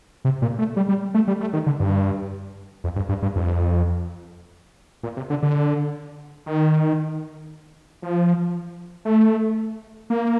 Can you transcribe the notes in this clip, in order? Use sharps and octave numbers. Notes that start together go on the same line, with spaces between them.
C3
A#2
A3
G3
G3
A3
G3
A3
D#3
D3
G2
F2
G2
G2
G2
F2
A#2
C3
D3
D3
D#3
F3
A3
A#3